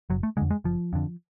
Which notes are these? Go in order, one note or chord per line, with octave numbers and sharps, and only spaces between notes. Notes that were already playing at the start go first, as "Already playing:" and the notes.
F#1 F#3
A3
F2 D3 G#3
G#3
F#1 F3
F2 D3